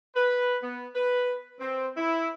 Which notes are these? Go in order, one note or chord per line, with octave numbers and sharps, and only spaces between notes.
B4
B3
B4
C4
E4